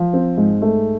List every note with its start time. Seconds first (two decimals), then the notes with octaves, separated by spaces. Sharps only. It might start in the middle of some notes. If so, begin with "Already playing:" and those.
Already playing: F3
0.13 C4
0.37 G#2
0.62 A3